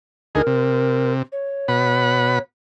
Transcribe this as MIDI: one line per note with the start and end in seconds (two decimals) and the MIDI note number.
0.35 0.42 38
0.35 0.42 63
0.35 0.42 68
0.35 1.13 70
0.47 1.22 48
1.32 2.42 73
1.68 2.39 47
1.68 2.39 78
1.68 2.39 83